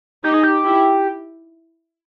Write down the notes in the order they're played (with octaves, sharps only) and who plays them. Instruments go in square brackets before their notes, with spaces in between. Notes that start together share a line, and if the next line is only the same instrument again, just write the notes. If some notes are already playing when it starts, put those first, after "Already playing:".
[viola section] D#4 [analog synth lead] G4
[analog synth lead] G#4
G4
[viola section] E4